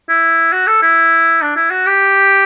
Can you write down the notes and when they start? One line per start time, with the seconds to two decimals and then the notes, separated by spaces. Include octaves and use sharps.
0.09 E4
0.52 F#4
0.67 A4
0.83 E4
1.42 D4
1.56 E4
1.70 F#4
1.86 G4